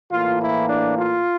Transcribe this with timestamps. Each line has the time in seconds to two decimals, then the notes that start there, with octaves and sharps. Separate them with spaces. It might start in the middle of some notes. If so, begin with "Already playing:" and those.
0.11 A2 E3 A#3 F4
0.40 E4
0.69 D4
0.98 F4